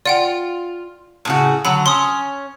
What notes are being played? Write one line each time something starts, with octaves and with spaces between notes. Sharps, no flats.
F4 D5 F#5 G5
A2 C#3 F#4
D3 F#3 B5
C#4 C6 D#6